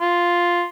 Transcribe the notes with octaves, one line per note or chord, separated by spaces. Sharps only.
F4